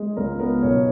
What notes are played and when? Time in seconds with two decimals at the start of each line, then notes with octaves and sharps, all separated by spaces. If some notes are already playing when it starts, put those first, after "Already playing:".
Already playing: G#3
0.17 C#2 A#4
0.39 B3 A#4
0.62 B1 C#5